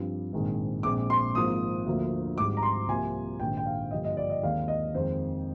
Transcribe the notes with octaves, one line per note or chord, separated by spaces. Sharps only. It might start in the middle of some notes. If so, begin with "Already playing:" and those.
Already playing: G2 F3 C4
A#1 G#2 D#3 G#3 C4
A#1 A#2 G#3 C4 D6
C6
G#1 G#2 F3 A#3 D#6
D2 D3 F3 A#3
G#1 G#2 G3 D6
A#5
C6
C2 C3 F3 A#3 G#5
A#1 G#2 D#3 G5
G5
F5
G2 D3 F3 A#3 D#5
D#5
D5
D#5
D#2 D#3 G#3 C4 F5
D#5
F2 D#3 G#3 C5